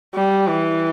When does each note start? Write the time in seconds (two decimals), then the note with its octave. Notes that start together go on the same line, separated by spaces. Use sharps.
0.15 G3
0.48 E3